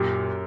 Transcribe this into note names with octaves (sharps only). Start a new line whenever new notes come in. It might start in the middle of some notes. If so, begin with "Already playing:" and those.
Already playing: F#2 A#2 G4